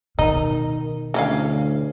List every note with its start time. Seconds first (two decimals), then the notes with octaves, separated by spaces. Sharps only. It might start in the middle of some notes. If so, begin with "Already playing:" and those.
0.19 B2 D#3 D#4
1.14 D2 E3 C#4 F5